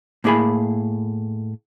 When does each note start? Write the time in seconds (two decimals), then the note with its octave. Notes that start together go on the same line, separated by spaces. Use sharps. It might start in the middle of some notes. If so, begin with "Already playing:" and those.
0.24 A2 A#3 E4 G#4 G#5 B5